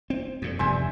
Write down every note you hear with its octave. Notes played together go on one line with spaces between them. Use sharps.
C4
F2 A#2
F1 E2 G2 C5 E5 G#5